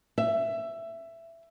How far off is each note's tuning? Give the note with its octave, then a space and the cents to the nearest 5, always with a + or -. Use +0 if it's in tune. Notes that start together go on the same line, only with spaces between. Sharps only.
E5 +15